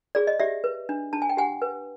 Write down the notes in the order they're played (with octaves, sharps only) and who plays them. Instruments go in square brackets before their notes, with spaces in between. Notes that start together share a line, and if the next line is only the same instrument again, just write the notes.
[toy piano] G#4 D5
D#5
G4 D5 E5
B4
D4
D4 A5
G#5
G5
G4 F#5 G#5
B4